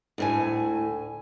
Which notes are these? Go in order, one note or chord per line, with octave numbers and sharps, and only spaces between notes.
D2 A2 G#5